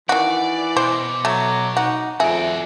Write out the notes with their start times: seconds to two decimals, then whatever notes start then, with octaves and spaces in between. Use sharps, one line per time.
0.09 D#3 E3 F#4 D5
0.77 B2 C5 D6
1.25 F#3 A3
1.77 D#4 F#4
2.20 F2 F#4 G#4 D5 E5